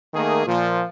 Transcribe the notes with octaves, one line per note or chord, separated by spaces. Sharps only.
D#3 A3 A#3 G#4
A#2 F3